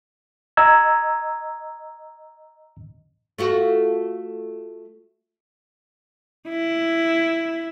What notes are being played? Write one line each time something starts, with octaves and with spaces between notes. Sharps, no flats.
D#5 A#5 E6 G#6
A3 F4 F#4
E4